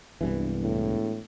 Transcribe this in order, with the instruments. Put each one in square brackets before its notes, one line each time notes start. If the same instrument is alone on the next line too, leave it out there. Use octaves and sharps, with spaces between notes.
[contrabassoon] E1 [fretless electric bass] C2 G2 E3
[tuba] A2